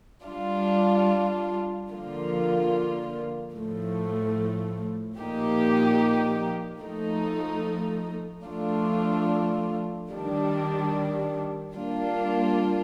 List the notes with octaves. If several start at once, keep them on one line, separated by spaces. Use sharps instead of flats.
G3 D4 F4
D3 F3 A#3 F4
A2 F3 A3
A#2 F3 A#3 D#4 G4
F3 A3 D#4
F3 A3 D4 F4
D#3 G3 D4
G3 A#3 D4 F4